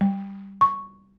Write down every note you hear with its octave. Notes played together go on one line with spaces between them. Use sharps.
G3
C#6